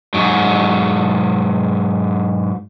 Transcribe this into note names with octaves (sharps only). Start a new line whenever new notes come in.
G#2 F#3